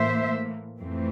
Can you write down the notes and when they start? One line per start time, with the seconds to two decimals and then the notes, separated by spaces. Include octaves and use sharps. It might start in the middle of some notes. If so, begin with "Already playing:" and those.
Already playing: A2 E3 A#3 C5 E5
0.79 F2 E3 A3 C4